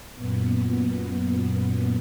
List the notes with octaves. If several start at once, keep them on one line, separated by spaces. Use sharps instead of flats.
F#2 A#2 B3